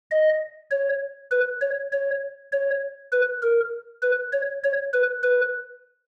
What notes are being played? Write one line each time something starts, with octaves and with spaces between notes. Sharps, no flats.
D#5
C#5
B4
C#5
C#5
C#5
B4
A#4
B4
C#5
C#5
B4
B4